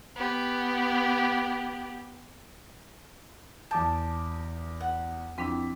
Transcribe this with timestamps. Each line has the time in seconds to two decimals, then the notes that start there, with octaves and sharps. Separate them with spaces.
0.16 B3 G4
3.71 E2 A5 D6 G6
4.81 F#5
5.38 F2 C4 D4 E4 G5 B6